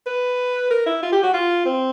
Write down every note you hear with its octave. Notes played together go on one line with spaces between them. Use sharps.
B4
A#4
E4
F4
G4
F#4
F4
C4